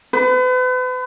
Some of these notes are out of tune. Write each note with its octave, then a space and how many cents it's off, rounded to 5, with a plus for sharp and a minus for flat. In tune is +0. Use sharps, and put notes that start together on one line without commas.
B4 +40